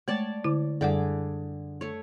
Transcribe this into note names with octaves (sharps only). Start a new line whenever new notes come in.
G#3 A3 C#5 D5 A5
D3 E4
F#2 D3 G3 G#4 F#5 D6
A3 C#5